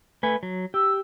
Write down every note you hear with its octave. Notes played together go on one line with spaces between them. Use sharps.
A3 B4 G#5
F#3
G4 E6